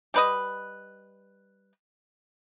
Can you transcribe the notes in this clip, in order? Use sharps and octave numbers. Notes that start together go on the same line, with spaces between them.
G3 B4 D#5